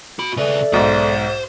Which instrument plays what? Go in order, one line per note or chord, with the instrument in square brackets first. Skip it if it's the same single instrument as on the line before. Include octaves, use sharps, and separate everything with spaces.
[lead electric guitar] F#4 B5
[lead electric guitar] C#3 B4 [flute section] A4 D5 E5
[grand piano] B1 G#2 [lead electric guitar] C5